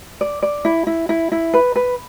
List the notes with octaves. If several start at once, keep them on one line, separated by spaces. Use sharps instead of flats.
D5
D5
E4
E4
E4
E4
B4
B4